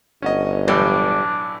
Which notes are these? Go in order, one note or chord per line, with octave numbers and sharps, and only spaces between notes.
G1 C#4 F#4 D#5
B1 A2 E3 G3 D4